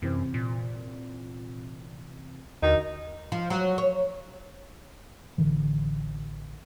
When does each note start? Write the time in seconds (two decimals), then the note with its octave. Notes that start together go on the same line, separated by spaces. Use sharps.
0.02 F#2 C3 E3 C4
0.34 A#2
2.62 D#2 D3 D#4 F#4 A#4
3.32 F3
3.50 F#3
3.78 C#5
5.38 A1 D3 E3